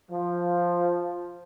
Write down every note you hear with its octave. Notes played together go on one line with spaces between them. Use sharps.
F3